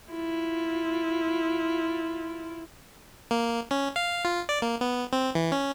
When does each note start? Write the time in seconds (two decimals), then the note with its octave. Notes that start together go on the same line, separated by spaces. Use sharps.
0.12 E4 F4
3.31 A#3
3.71 C#4
3.96 F5
4.25 F4
4.49 D5
4.62 A#3
4.81 B3
5.13 C4
5.35 E3
5.52 C#4